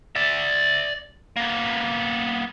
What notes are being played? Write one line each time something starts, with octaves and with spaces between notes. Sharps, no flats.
D5 E5
A#3 B3